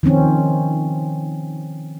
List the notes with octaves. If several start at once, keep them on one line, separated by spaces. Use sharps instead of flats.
D#3 F3 C4 C#4